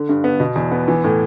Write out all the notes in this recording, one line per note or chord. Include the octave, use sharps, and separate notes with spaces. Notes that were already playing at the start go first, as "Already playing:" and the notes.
Already playing: D3
G2
B3
B2
E2
B3
E3
A2